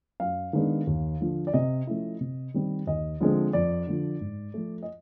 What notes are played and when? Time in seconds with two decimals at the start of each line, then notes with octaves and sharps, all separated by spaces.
0.20 F#2 F5
0.53 D#3 G#3 B3 D4
0.87 D#2
1.21 D3 F3
1.47 D5
1.54 C3 D#5
1.87 F3 A3 C#4 E4
2.21 C3
2.54 D#3 G3 C4
2.87 D#2 D#5
3.21 D3 F3 G#3 C4
3.53 F2 D5
3.87 D3 F3
4.21 G#2
4.54 F3 A3
4.83 D#5